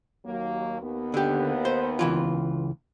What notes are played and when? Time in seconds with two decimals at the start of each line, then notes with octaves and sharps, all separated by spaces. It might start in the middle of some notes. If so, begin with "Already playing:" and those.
0.25 D#2 F#3 A#3
0.81 D#2 B3
1.14 D3 G4
1.65 C5
1.99 C#2 E3 F4